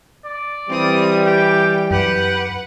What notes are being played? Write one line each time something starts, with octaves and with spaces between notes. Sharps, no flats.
D5
E3 G3 C4 D#6
G4 G5
F#2 G4 B4 F#5